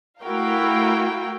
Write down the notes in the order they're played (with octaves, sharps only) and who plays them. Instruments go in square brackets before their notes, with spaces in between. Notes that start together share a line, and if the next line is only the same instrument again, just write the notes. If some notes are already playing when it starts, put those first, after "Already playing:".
[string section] A3 E4 F#4 A#4 F5 G5